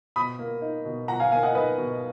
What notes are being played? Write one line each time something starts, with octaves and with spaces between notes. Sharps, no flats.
B2 B5 D#6
A#3
D#4
B2
B2 F#5 A#5
F5 G#5
A#3 F5 G#5
D#5 F#5
D#4 B4 D#5
B2